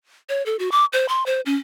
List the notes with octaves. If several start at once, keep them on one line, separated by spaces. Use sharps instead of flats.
C#5
A4
F#4
D6
C5
C6
C5
C#4